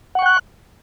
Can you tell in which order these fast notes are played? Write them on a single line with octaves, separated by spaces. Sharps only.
F#5 C#6 G5 F#6